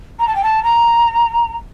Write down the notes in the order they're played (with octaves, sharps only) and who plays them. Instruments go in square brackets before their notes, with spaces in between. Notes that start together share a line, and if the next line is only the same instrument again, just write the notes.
[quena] A#5
A5
G5
A5
A#5